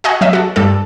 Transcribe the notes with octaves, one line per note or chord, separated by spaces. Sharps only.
F#4 D#5 F#5 G#5
F#3 D#5 E5
F#4 A5
G2 G3 A4